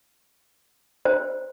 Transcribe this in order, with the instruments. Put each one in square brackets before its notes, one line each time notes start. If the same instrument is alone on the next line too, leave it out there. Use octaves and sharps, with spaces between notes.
[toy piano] C5